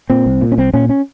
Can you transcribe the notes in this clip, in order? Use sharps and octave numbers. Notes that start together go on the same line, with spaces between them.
A#2 C4
C2
A#2
C#4
C2 C4
A#2 C#4
C#4